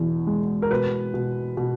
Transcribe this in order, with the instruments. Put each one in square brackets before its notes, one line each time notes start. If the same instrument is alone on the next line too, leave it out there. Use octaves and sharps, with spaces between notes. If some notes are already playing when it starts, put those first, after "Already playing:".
Already playing: [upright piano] E2 B2
G#3
A#4
B2 B4
B2
B2